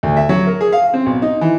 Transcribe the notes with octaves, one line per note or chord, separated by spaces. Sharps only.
D2
E5
F#3
A#4
G#4
F5
C4
B1
D#4
E3